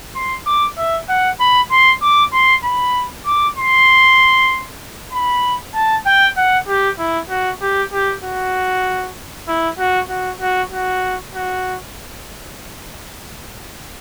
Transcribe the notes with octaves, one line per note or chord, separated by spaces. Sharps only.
C6
D6
E5
F#5
B5
C6
D6
C6
B5
D6
C6
B5
A5
G5
F#5
G4
E4
F#4
G4
G4
F#4
E4
F#4
F#4
F#4
F#4
F#4